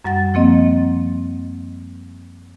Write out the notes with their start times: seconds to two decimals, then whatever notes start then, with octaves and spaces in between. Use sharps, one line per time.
0.04 F#2 G3 F#5 A6
0.34 F3 A#3 C4 D#5